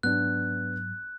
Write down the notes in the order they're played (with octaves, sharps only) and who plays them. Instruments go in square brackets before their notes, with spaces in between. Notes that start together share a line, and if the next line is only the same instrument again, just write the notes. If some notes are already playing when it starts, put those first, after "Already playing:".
[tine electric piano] G#2 F#3 [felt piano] B3 D4 [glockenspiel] F#6